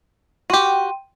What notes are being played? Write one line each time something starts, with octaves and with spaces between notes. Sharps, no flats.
F#4 G4 G5 C6 D#7